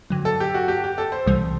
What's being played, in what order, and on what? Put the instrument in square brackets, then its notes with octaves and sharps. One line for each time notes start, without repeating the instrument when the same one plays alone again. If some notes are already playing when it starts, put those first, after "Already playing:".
[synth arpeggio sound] G2 D3 F#3
[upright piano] A4
G4
F#4
G4
G4
A4
C5
[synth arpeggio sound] C2 C3 E3 G3